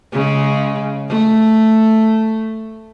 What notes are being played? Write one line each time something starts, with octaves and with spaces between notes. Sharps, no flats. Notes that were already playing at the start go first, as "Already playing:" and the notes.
C#3 G#3
A3